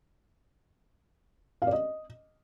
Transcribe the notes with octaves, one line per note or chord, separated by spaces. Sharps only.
F5
D5
D#5